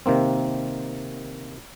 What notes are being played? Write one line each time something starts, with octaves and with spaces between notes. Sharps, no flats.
C3 D#3 A#3 C4